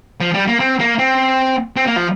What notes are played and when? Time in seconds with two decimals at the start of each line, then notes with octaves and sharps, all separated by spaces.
0.21 F3
0.34 G3
0.48 A#3
0.60 C4
0.80 A#3
0.99 C4
1.76 C4
1.87 A#3
1.96 F3